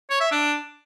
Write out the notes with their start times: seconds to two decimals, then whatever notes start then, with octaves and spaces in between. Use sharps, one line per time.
0.10 C#5
0.21 E5
0.31 D4